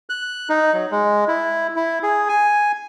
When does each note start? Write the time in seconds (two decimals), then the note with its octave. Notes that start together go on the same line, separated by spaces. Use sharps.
0.10 F#6
0.49 D#4
0.74 F#3
0.91 G#3
1.28 E4
1.76 E4
2.03 G#4
2.29 G#5